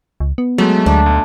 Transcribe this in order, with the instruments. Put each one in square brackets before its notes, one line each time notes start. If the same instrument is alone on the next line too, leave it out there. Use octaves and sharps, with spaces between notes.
[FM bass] C#2
B3
[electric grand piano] F#3 G#3 [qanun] A3
[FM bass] D2 [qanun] D4
[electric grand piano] B1